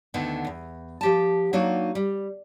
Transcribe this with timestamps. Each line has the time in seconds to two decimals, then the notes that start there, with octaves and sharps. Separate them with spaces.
0.14 D2 D3 D#3 B3
0.47 E2
1.01 F3 G4 A5
1.53 F#3 A#3 D4 D#4 F#4
1.95 G3